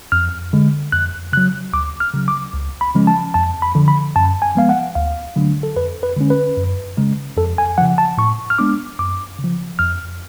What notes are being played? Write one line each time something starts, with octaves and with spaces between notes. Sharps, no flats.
F2 F6
D3 G#3
F2 F#6
C#3 F#3 F#6
D2 D6
F6
C#3 F#3
D6
C#2
B5
C#3 F3 G#3 C#4
A5
F2 A5
B5
D3 F3
B5
F#2 A5
G#5
F3 G#3 B3 F5
F#5
D2 F5
D3 F#3 A3 D4
A4
F2 B4
B4
D3 G#3 C#4
B4
F#2
C#3 G#3
F2 A4
G#5
C#3 F3 F#5
A5
A2 C#6
F6
G#3 B3 D4 D6
F#2 D6
C#3 F3
F2 F6